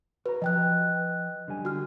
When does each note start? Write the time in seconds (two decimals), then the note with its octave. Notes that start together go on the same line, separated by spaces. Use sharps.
0.26 F#4 B4 A#5
0.42 F3 D#5 G5 F#6
1.48 D3 G3 G#5
1.65 F#4 F6